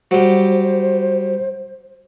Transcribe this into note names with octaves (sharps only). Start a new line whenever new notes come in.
F#3 G3 C5